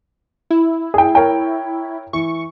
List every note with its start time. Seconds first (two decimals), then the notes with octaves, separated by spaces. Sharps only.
0.50 E4
0.94 G#4 G5
1.15 A#4 C#5 G5
2.13 E3 C#6